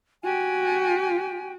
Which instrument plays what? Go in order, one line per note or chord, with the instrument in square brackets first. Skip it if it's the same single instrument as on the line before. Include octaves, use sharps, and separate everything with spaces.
[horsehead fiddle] F#4 [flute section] G4 G5 G#5